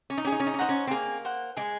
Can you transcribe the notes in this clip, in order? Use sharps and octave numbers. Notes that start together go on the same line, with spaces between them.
C#4
D#4
C#4 G#4
D#4
C#4
D#4
C#4
D#4 C5 F#5 A#5
C#4
C4
A#3 G#4
C5 F#5
G#3 G#4